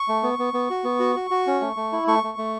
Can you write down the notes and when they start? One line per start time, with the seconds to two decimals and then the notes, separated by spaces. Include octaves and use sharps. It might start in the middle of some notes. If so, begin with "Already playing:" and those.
Already playing: C#6
0.08 A3
0.23 B3
0.39 B3
0.54 B3
0.70 F#4
0.84 B3
1.00 F#4
1.16 F#4
1.31 F#4
1.47 C#4
1.61 A3
1.76 A3
1.92 E4
2.07 A3 C#6
2.23 A3
2.38 A3